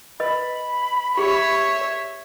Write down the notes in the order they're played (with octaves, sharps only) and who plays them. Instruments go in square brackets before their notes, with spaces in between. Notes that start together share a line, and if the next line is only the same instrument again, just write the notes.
[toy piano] B4 D#5 [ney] B5
[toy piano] G4 G#4 [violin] C#5 E5